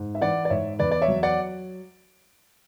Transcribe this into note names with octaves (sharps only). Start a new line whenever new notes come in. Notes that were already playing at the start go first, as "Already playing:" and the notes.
Already playing: G#2
E5
E3 D5 F#5
D5
G#2 C#5 E5
E2 B4 D5
D5
C#5 E5
F#3
D5 F#5